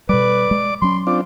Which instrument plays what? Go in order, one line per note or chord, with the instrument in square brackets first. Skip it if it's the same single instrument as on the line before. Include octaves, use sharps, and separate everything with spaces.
[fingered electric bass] B2 G3 [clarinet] B4 [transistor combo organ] D5 D6
[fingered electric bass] G#3
[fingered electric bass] F#3 C#4 [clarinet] C6
[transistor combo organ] C4 D4 F4 [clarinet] D6